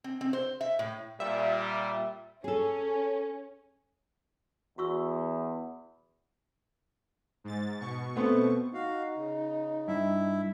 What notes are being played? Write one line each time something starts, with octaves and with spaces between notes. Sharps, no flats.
C4
C4
C5
E5
A2
A#2 G3 E5
C#4 G#4 A4
E2 F#4 C#6 E6
G#2 A6
B2 C#6
A3 B3 C4
D#4 F#4 F5
C#3
G2 E4 E5